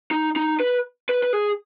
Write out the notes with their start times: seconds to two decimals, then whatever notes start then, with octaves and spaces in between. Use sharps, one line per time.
0.11 D#4
0.36 D#4
0.60 B4
1.09 B4
1.23 B4
1.33 G#4